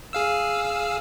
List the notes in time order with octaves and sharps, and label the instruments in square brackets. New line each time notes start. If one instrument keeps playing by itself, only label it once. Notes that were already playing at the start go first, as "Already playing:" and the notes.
[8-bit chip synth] G#4 F5 E6